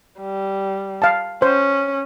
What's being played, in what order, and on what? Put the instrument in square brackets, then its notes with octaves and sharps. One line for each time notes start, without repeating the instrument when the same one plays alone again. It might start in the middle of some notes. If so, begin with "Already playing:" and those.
[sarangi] G3
[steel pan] F5 A5
[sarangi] C#4 [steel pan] C5